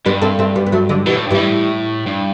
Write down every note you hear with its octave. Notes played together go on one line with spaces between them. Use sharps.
G2 G3 B3
A3 C4
A3 C4
G3 B3
B3
F#3 A3
D3 F#3
B2 E3 G3
A2
G2
A2 E3 G3
G2